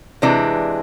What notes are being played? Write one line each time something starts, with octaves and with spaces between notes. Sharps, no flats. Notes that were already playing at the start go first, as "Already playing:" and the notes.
C3 E3 G#3 D4